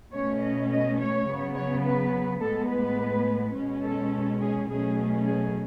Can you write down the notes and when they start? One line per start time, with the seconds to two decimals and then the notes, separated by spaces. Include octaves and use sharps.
0.12 B2 A3 C#4 C#5
0.42 D#5
0.69 D#5
0.99 C#5
1.26 C#3 F#3 B3
1.55 C#5
1.84 B4
2.40 A2 G#3 B3 A4
2.69 B4
3.54 B2 G#3 C#4
3.83 A4
4.41 G#4
4.69 B2 F#3 A3 C#4 G#4
5.26 G#4